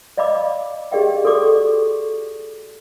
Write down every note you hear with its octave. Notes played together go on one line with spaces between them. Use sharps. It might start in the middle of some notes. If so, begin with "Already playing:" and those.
D5 D#5 F5 B5 D6
G4 G#4 D5 D#5 F5 G5
F#4 A4 D5 C#6 D6